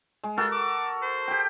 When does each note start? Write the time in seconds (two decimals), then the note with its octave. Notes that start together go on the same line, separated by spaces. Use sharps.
0.24 G#3
0.37 F4 F#4 A4 A#4
0.51 D6
1.02 C5
1.28 G4 G5